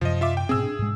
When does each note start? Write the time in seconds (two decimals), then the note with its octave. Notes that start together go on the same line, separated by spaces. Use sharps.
0.01 F#2 C3 F3 D#5
0.21 F4 E5 D6
0.37 G5
0.49 G#2 B2 C4 G#4 E6
0.63 D4
0.79 G#2 B2 G#3